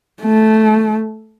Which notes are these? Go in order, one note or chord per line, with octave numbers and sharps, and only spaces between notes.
A3